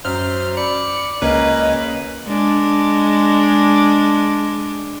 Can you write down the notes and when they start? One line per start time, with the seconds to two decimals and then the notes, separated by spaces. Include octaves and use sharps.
0.05 F#2 C5 F6
0.57 D5 B5 C#7
1.22 C#2 A#3 C#4 B4 D#5
2.27 G#3 D4